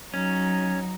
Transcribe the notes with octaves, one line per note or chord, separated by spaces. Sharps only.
F#3 C#4 D#4